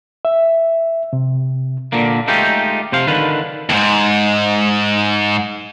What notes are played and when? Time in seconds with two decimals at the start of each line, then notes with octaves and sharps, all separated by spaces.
0.25 E5
1.13 C3
1.92 A#2 D3 A#3
2.27 G#3 A3 D#4 F4 G4
2.92 C3 C5 F5
3.07 D3 D#3 F4 B4
3.70 D#2 G#2